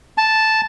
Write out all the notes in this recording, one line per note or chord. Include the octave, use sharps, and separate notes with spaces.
A5